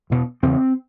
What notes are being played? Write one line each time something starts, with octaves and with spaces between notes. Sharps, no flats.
E2 B2
E2 C#3 C4